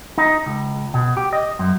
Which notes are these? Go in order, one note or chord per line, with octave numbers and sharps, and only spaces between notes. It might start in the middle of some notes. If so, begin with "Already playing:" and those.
D#4
C#2
B2
G4
D#5
F#2